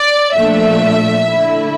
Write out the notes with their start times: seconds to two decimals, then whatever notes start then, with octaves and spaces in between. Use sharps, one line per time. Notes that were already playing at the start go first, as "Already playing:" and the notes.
Already playing: D5
0.35 A#2 F3 A3 D4 E5
1.27 D3 A3 E4